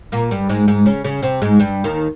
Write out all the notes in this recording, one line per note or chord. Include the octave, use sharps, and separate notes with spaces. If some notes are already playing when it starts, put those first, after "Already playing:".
A#2 A#3
G2 G3
G#2 G#3
G#2 G#3
C#3 C#4
C#3 C#4
C3 C4
G#2 G#3
G2 G3
D#2 D#3